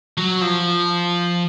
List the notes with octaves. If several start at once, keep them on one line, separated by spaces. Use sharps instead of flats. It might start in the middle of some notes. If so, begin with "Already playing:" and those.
F#3
F3